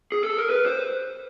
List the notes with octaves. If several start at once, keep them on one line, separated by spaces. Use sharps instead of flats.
G#4
A4
A#4
B4
C5